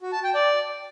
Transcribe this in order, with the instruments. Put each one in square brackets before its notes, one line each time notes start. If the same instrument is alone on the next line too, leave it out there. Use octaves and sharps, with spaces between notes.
[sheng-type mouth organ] F#4
A5
G5
D5